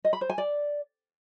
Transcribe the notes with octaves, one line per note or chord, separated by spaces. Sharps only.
D#5
B5
C5
G#5
D5